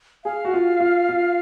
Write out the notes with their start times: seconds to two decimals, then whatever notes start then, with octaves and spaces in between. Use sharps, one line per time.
0.25 G#4 F5
0.45 F#4
0.53 F4
0.80 F4
1.09 F4